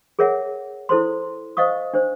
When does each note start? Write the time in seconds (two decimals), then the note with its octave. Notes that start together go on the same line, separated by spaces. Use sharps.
0.19 G#4 A#4 C#5 E5 F#5
0.89 E4 A4 C5 C6
1.57 C5 D#5 F5 C#6 D#6
1.93 D4 C5